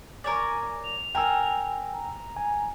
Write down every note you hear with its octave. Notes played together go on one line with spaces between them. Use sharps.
A#4 C#5 D5 G#5
F7
A#4 G5 G#5 E6
A#5
G#5